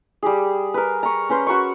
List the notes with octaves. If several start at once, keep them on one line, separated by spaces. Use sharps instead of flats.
G3 G4 G#4
A#4 B4
A#5 C#6
C#4 B4 C5
F#4 A#4 B5 C#6